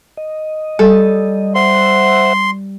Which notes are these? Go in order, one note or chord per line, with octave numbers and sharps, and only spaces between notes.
D#5
G3 A4
C5 E5 F#5 C6